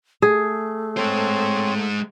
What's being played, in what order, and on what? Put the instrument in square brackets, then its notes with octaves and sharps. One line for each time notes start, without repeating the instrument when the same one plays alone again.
[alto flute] A3 [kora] G#4
[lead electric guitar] G#3 C5 [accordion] C4 C#5 C6